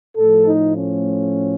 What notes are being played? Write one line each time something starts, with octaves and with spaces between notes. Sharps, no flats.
A2 F3 A3 A4
D#4
C#4